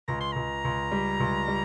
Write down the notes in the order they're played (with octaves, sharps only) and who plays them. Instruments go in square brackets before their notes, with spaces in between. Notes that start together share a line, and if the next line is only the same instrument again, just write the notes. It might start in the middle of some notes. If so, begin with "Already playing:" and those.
[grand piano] C#2 [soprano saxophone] A#5
[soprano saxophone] C6
[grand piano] C#2 [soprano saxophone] A#5
[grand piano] C#2
G3
C#2
G3